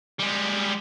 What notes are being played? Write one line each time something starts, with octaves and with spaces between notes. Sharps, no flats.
G3 G#3